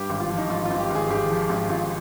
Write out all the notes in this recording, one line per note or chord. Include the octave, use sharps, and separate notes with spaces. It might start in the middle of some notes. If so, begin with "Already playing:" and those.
Already playing: G2 G4
G#1
F4
F3
D#4
G#1 F4
G#1 F4
G4
G#1
G#4
G#1 G4
F3
G#1
G#1 F4